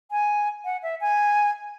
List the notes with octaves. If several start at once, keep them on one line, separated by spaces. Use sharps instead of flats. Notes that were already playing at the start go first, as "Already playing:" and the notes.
G#5
F#5
E5
G#5